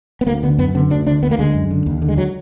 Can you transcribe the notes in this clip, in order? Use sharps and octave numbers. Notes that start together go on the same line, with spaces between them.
B3
D2 A#3
D3 B3
F#2 B3
D3 B3
D2 D4
D3 D4
D2 B3
A#3
D3 G#3
F#2
D3
D#2
D3
G#3
F#3